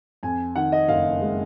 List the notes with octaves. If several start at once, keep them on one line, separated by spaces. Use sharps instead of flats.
F2 G#5
D#3 F#5
D#5
F#1 F5
G#3